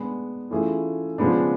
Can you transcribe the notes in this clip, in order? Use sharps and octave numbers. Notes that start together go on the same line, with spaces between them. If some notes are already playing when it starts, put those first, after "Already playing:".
Already playing: G#3 B3 D4
E3 A3 C#4 F4 G#4
C#3 F3 G#3 B3 D4